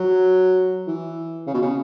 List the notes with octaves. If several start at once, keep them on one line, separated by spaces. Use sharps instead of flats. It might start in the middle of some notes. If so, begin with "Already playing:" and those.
Already playing: F#3
E3
C#3
B2
C#3